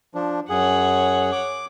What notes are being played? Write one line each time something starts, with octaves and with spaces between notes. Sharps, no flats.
F3 D4
F#2 G#4 C#5 F#5
D6